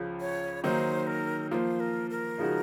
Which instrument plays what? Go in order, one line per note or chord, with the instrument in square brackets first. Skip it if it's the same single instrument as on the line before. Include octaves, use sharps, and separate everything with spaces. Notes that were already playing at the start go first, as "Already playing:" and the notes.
Already playing: [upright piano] C#2 C#3 F3
[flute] C#5
[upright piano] D#3 F#3 A#3 D#4 [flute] C5
[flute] A#4
[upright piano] F3 A#3 F4 [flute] C5
[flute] A#4
A#4
[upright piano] C#3 F3 G#3 D#4 F#4